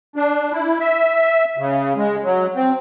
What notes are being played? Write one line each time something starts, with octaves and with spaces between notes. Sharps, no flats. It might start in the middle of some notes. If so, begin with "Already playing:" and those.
D4
E4
E5
C#3
G#3
F#3
C4